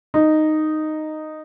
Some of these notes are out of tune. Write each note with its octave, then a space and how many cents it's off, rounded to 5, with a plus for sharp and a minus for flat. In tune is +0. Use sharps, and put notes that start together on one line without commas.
D#4 -5